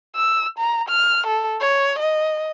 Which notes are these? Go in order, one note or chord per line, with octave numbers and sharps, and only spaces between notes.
E6
A#5
F6
A4
C#5
D#5